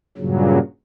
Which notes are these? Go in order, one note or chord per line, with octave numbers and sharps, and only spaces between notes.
G2 A#2 C#3 F#3